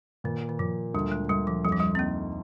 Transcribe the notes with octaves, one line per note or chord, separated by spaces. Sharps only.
A#2 D#3
D#3
A#2 F3
D2 G3
G#3
D2 G3
F3
F2 G3
F3
G3
C4
A#3 D#4